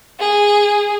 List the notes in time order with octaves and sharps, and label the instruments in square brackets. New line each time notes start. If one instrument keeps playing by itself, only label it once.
[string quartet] G#4